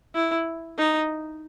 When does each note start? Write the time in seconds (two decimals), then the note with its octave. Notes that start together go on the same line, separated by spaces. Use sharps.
0.15 E4
0.78 D#4